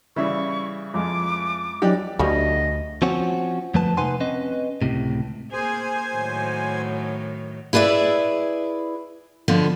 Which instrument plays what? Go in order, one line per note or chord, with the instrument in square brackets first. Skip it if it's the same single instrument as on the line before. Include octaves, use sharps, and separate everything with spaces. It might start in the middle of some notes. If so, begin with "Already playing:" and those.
[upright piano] C#3 E3 [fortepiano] G3 E4 E5 [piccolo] C#6
[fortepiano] F2 G#3 [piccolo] D6
[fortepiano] E3 [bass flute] F#3 [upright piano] D4 D#4 G4
[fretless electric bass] D2 D3 [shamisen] G3 A3 C#4 [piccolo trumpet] D#5
[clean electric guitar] F3 C4 C#4 F#4
F2 F3 A3 B4 A5
C3 D#4 B4 F#5 G#5 C6
C4 C#4 B4 D#5
C#2 A2 C3
[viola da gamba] A#3 G#4 [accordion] C5 G#5
[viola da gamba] A2 D#3 F#3
[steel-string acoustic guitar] E4 G#4 B4 D5 E5
B2 D3 F3 B3